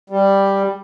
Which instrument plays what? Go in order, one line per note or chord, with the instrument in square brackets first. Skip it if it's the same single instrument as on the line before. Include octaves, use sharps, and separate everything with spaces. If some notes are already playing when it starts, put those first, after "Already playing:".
[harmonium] G3